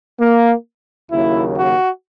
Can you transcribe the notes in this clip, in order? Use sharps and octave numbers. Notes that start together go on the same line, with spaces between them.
A#3
D#2 C#3 F#3 A#3 E4
F#4